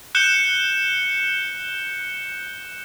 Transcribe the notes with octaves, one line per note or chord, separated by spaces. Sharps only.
F#6 G6 C#7 E7 G7